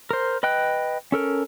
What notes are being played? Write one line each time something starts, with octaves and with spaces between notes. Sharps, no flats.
A#4 C5
B4 D#5 G5 F#6
C#4 A4 A#4